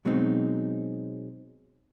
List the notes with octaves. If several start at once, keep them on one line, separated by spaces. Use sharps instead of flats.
B2 F#3 G#3 B3 C4 D#4